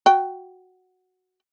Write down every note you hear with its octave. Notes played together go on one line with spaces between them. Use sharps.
F#4 G5